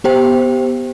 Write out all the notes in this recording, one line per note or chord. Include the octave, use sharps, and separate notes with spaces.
B3 G4 C5 G5